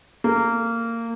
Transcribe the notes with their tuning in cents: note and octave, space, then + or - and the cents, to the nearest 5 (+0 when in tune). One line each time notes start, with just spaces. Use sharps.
A#3 -20